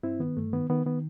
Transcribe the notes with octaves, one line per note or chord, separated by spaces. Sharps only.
G2 C4 E4
D#3 B3
G2 A3
D#3 B3
D#3 B3
D#3 B3